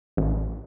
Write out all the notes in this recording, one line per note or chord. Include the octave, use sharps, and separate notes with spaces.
A1